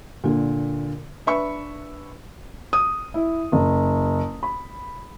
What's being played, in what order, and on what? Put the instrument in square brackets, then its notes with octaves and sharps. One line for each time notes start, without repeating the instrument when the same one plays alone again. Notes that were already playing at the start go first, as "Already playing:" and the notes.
[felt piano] A#2 D3
D4 B4 E5 B5 C#6
D#6
E4
F#1
B5